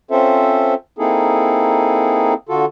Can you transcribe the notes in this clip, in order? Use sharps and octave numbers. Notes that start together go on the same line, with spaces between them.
C4 C#4 F4 A4 C5 E5
A#3 C4 D#4 E4 G#4 A4
D3 F4 F#4 A4